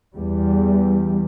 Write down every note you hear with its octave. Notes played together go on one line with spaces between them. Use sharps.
E2 G3